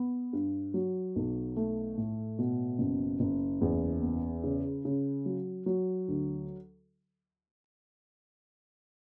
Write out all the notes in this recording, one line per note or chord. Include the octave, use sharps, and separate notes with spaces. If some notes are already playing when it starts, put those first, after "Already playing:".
Already playing: B3
G2
F#3
B1
A3
A2
B2
F#1
F#1
E2
B3
C#3
C#3
F#3
F#3
D2